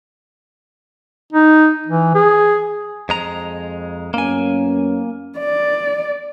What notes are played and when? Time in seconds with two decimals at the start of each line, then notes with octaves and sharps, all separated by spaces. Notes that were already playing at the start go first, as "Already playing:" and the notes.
1.33 D#4
1.87 E3
2.15 G#4
3.09 F2 G#3 A#5
4.14 F#2 A#3 B3 C#4 G#5
5.39 D5